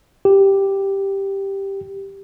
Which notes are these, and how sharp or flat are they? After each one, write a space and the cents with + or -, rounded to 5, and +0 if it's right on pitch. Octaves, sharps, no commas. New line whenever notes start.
G4 +0